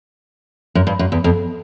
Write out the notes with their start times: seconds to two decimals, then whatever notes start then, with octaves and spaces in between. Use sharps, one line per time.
0.75 F#2
0.87 G2
0.99 F#2
1.12 E2
1.24 F2